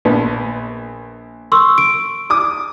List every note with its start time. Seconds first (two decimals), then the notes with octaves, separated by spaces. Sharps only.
0.05 A#1 B3
1.52 C6 C#6 E6
1.78 D7
2.30 D6 D#6